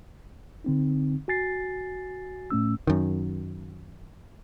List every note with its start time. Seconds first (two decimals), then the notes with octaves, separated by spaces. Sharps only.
0.64 D3 C4 D#4
1.28 F#4 G#5 A6 C7
2.51 A2 A3 C#4 E6
2.87 F#2 D#3